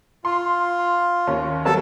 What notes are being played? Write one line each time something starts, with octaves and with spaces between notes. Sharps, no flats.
F4 C6
D#2 C#4
F#3 G3 B3 A4 A5